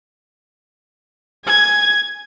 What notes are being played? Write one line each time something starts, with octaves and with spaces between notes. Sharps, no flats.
G#5 G#6